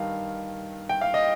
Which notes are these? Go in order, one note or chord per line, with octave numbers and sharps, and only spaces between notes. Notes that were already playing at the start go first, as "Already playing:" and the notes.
Already playing: G2 D#3 F5
G5
F5
D#5